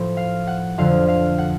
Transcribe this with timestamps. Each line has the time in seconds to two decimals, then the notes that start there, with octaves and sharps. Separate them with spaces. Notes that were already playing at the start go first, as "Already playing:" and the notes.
Already playing: A2 F3
0.17 F5
0.47 F#5
0.78 F2 D3 F3 F5
1.08 F5
1.38 F#5